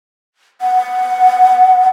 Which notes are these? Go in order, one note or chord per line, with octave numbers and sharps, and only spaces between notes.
F#5